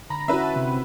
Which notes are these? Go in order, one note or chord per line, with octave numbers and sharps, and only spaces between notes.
D3 A#5 B5
C#4 E4 F#4 B4 E5
A5
C3